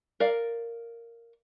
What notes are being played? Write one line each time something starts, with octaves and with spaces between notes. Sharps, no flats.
A#4 D5 F5